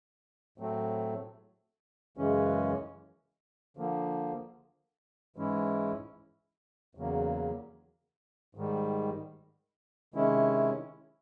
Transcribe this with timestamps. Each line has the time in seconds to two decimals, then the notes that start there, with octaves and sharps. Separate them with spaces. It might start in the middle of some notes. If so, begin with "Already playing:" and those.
0.58 A2 F#3 A3 C4
2.17 F#2 C#3 E3 G#3 C#4
3.77 D3 F3 A#3
5.36 G#2 E3 G#3 C#4 E4
6.95 E2 C#3 F#3 A#3
8.55 G#2 D#3 G3
10.14 C3 D#3 G#3 C#4 E4